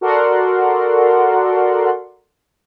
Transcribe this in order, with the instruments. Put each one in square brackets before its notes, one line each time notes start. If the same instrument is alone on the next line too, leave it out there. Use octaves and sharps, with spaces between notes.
[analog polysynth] F#4 A4 A#4 D5 F#5 C6